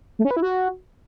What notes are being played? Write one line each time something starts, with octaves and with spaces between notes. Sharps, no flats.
A3
C#4
B4
E4
F#4